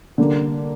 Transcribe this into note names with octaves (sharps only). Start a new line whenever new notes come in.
D3 G3 A#3